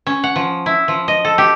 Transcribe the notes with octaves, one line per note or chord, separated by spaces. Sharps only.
C#4
F#5
F3
E4
F3
D#5
A4
G4